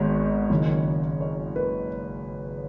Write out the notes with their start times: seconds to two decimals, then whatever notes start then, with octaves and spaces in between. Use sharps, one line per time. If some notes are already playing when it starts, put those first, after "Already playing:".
Already playing: G#1 G#2 D#3 G#3 B3 C#5
0.50 F#1 F#2 D#3
1.21 C#5
1.56 B4